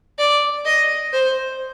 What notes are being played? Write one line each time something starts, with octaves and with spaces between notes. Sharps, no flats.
D5
D#5
C5